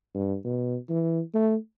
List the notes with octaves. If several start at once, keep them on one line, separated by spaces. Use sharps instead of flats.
G2
B2
E3
A3